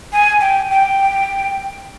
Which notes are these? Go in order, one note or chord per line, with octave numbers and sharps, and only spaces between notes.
G#5
G5
G5